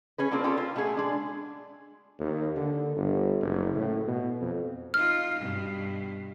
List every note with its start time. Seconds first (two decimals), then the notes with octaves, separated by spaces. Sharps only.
0.18 C#4 G#4 B4
0.31 A#3 C4 D4 F4 A#4
0.44 C4 C#4 F4 G#4 A4 D5
0.57 F4
0.76 B2 A3 B3 G#4
0.97 G#3 D4
2.19 D#2
2.56 D3
2.96 G1
3.41 F#1
3.75 A2
4.07 B2
4.41 F2
4.94 D#4 F4 F6
5.39 G2 B2